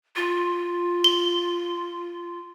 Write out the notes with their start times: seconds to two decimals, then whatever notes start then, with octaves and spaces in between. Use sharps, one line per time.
0.16 F4
1.04 G7